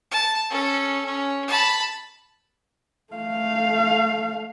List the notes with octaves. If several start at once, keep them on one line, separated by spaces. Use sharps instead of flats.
A5
C#4 A4
C#4
A5 B5
A3 F5